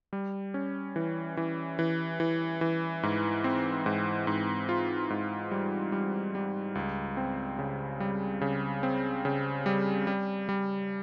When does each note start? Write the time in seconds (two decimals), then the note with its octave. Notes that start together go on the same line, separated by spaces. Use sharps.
0.13 G3
0.54 C#4
0.96 E3
1.37 E3
1.79 E3
2.20 E3
2.61 E3
3.03 G#2
3.44 C4
3.86 G#2
4.27 G#2
4.69 F4
5.10 G#2
5.51 G3
5.92 G3
6.35 G3
6.75 C#2
7.17 C4
7.59 C#3
8.00 G3
8.41 C#3
8.83 C4
9.25 C#3
9.66 G3
10.07 G3
10.49 G3